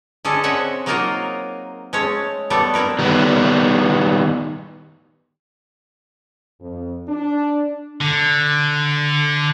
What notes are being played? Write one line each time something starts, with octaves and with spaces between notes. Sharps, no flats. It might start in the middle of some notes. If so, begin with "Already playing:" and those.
D3 C#4 G#4 A4 D#5
C4 C#4 F#4 D#5 E5 F#5
F#3 A#3 D#4 F4 F#4 A#4
G#3 A3 C#4 C#5
G3 A3 B3 A4
C4 E4 A#4 B4
D#3 G3 B3
F2
D4
D3